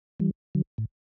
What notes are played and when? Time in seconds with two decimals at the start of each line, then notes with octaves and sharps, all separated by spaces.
0.20 E3 G3
0.55 D3 F#3
0.78 A2